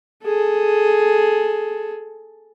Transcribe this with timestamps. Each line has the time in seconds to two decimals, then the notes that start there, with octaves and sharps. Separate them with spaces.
0.24 G#4 A4